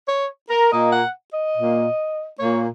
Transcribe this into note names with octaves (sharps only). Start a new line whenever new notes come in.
C#5
A#4
A#2 A#3 D#5
F#5
D#5
A#2 A#3
A#2 A#3 C#5